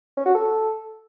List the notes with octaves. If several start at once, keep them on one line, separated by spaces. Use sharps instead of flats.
C#4
F#4
A4